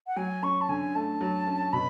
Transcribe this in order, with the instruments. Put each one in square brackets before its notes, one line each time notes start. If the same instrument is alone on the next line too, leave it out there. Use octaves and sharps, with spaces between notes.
[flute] F#5
[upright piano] F#3 [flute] G#5
[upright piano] C#4 [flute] C#6
[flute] A5
[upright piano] D3 [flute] G#5
[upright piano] A3 [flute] A5
[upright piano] F#3
C#4
[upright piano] B2 [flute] B5